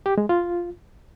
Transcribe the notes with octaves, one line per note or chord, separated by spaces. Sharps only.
G4
G#3
F4